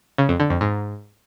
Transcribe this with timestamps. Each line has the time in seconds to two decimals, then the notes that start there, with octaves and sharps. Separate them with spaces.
0.18 C#3
0.29 F2
0.40 D3
0.50 F2
0.61 G#2